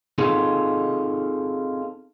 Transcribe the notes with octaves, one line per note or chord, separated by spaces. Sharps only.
C4 D#4 F4 G#4 A4